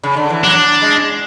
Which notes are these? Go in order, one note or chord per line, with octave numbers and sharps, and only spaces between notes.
C#3
D3
E3
F#3 D4
G#3